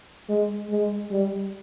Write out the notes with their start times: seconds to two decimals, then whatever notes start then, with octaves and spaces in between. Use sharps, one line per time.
0.29 G#3
0.70 G#3
1.11 G3